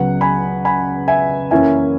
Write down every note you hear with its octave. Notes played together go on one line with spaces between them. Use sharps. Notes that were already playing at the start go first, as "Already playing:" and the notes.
Already playing: C#2 C#3 F#3 B3 F#5
G#5 B5
G#5 B5
E5 G#5
F#2 E3 A#3 C#4 E4 E5 G#5